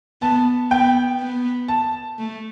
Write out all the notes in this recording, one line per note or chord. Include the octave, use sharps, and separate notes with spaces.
B3 A5
B3 G5
B3
A5
A3